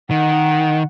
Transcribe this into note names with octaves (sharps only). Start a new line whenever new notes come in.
D#3 F#5